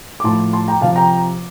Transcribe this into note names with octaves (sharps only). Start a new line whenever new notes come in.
D6
A2 F3 A5 C6
A5 C6
G5 A#5
C3 F3 F5 A5
G5 A#5